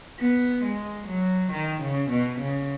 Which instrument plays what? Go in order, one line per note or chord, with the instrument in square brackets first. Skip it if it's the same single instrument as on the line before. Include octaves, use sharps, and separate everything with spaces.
[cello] B3
G#3
F#3
D#3
C#3
B2
C#3